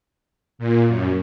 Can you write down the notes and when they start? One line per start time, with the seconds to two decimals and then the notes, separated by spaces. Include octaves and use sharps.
0.59 A#2
0.88 F#2